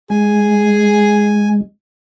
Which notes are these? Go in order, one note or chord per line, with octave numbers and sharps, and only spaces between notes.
G#3 G#4 G#5